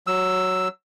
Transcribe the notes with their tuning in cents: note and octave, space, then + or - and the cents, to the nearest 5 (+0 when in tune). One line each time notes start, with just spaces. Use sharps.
F#3 +0 E6 +0